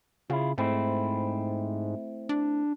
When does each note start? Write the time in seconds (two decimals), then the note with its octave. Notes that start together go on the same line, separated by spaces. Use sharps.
0.30 C#3 E4 F4
0.58 G#2 A3 C4 E4
2.29 D4